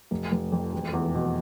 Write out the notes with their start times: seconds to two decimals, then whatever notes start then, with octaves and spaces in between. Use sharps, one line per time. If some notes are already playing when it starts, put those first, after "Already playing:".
0.11 F1
0.32 F1
0.52 F2
0.73 E1
0.93 E2
1.15 B2